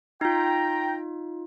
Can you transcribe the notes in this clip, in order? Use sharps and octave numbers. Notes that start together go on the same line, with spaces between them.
D#4 F4 G5 A#5